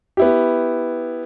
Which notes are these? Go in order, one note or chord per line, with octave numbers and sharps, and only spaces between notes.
B3 E4 G4